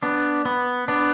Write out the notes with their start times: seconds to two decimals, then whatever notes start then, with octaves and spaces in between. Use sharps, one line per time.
0.03 B3 D4
0.45 B3
0.88 B3 D4